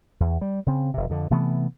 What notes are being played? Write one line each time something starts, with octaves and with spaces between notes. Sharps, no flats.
E2
G3
C#3 C4
F1 C3
F2 D3
C3 E3 A3 B3